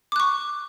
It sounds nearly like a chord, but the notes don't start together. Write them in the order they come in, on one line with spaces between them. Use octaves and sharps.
D6 F#6 C#6